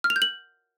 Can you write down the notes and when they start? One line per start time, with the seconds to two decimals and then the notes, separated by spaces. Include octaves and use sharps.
0.04 F6
0.10 F7
0.16 G6
0.22 F#7